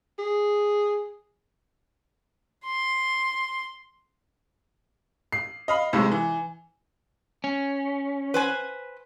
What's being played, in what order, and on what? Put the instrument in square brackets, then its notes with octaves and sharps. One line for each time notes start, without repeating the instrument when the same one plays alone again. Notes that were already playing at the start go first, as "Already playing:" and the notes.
[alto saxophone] G#4
[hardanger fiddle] C6
[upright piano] C7
D#5 F5 B5
B1 A2 C3 G#3
E3
[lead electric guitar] C#4
[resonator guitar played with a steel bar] B4 C5 G#5